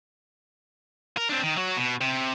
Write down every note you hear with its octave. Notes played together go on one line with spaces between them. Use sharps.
A#4
C4 D4
D#3
F#3 F#4
B2
C3